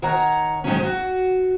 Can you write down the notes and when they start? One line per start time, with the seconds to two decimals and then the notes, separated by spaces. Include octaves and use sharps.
0.02 D#3 C#5 F#5 A#5
0.64 G#2 D#3 F#3 C#4
0.83 F#4